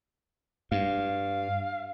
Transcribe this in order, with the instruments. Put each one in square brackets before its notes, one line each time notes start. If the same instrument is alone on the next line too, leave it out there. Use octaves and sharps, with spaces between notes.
[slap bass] G2 [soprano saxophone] F5